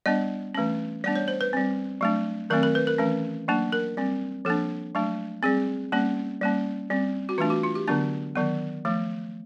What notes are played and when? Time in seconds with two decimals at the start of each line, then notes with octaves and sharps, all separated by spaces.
0.06 G3 B3 D4 D#5
0.55 E3 A3 C#4
1.04 G3 B3 D4 D5
1.16 C#5
1.28 C5
1.41 B4
1.53 G3 C4
2.01 F#3 A3 D4
2.50 D#3 F#3 A3 C4 A#4
2.63 A#4
2.75 B4
2.87 A#4
2.98 E3 A3 C#4
3.48 F#3 A#3 D4
3.72 A#4
3.97 G3 C4
4.45 F3 A#3 D4 A4
4.95 F#3 A3 D4
5.43 G3 C4 G#4
5.92 G3 A#3 C#4
6.41 G3 A#3 C#4
6.90 G3 C4
7.29 F#4
7.38 E3 A3 D4 F4
7.50 F#4
7.63 F4
7.75 G4
7.87 D3 F#3 B3 D4
8.36 D#3 F#3 B3
8.85 F3 A3